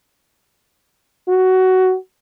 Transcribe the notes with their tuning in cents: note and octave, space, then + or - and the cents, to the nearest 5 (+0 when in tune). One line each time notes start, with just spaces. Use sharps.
F#4 +15